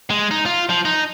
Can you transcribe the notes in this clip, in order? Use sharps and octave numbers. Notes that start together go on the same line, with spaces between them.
G#3
D#4
F4
F3
D#4